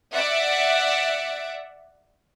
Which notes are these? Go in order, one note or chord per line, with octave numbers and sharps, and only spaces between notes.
D5 E5 F#5